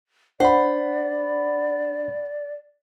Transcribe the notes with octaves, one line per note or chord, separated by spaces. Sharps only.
D4 C5 D5 F#5 B5